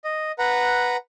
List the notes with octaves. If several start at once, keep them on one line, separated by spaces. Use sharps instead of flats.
D#5
B4 F#5 A#5